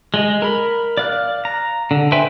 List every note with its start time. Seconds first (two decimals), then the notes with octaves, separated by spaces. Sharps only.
0.14 G#3 D#5
0.42 A#4 B5
0.97 D5 F5 F#6
1.45 A#5
1.91 D3
2.12 B4 C5 E5 G5 G#5